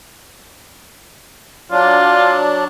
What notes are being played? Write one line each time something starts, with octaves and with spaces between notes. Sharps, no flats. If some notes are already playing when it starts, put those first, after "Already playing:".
F#3 D4 F4